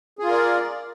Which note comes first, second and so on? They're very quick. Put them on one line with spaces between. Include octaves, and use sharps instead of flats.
G#4 F4 A#4 D5